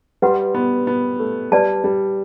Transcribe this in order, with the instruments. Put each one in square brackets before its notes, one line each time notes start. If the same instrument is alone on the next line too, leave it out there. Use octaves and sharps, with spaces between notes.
[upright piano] G3 [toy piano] B4 F#5 C6
[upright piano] B3
B3
A3
[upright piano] G3 [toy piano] B4 D5 A5
[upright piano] G3